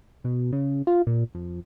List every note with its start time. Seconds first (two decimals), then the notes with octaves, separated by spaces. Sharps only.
0.24 B2
0.52 C#3
0.87 F4
1.07 A#2
1.35 F2